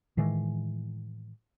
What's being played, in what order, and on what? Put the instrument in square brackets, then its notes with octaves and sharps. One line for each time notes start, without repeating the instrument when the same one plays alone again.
[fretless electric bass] A2 D#3 E3 G#3